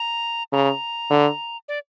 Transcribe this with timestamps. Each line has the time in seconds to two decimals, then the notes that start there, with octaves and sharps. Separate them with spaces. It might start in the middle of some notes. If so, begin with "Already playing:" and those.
Already playing: A#5
0.52 C#3 A#5
1.10 D3
1.68 D5